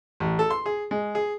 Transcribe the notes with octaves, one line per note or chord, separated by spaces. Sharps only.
A1
A4
C6
G#4
G#3
G#4